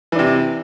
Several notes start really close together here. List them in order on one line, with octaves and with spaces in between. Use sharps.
E3 D4 C3